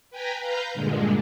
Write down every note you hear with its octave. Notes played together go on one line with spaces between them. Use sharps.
B4 G5 G#5 A#5 B5
B4 F5 A#5 G6
G2 A#2 D3 G#3